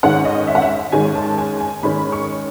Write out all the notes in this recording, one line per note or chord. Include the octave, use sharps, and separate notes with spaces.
G#2 D#3 G#3 C#4 F#5
D#5
E5
F#5
E5
G#2 D#3 G#3 C#4 G#5
A5
G#5
G#5
G#2 D#3 G#3 C#4 B5
C#6